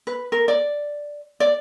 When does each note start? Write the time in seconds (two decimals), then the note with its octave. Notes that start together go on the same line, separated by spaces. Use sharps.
0.07 B4
0.32 A#4
0.48 D5
1.40 D5